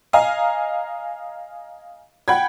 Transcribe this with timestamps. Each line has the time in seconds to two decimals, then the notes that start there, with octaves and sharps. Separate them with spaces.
0.13 D#5 F5 G#5 A#5
2.28 F#5 G5 B5 G#6